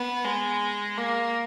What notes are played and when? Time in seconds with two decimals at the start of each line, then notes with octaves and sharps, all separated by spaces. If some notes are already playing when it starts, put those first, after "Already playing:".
Already playing: B3
0.25 G#3
0.98 A#3